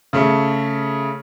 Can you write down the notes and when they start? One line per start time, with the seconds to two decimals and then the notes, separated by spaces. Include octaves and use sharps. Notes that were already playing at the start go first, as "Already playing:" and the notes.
0.13 C#3 A3 C#4